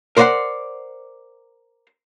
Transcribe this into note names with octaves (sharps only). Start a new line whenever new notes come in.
A#4 C5 D5 D#5 F#5 C6